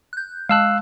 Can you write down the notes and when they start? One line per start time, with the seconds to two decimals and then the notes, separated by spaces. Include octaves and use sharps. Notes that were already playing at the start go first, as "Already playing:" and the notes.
0.13 F#6 G6
0.49 G#3 F5 A5 E6 F#6